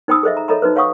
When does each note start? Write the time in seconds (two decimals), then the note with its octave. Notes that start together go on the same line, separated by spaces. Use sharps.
0.08 D#4 C5 G5 B5 D#6 E6
0.23 G#4 A4 C5 D#5 E5
0.37 A#5
0.48 A4 C#5 D#5 E5 A#5 B5
0.62 D#4 F#4 B4 C5
0.76 C#5 F5 F#5 C#6 D#6